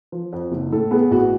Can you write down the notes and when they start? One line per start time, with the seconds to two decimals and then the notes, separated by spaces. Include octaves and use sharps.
0.12 F3
0.33 F2
0.52 F#1
0.72 A2 A4
0.91 B3 G#4
1.11 A1 F#4